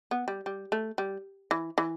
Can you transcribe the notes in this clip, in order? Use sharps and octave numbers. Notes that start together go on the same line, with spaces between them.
B3
G3
G3
A3
G3
E3
E3